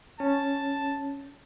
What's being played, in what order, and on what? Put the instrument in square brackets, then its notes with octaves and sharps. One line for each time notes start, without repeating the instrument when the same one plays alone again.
[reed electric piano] C#4 [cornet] A5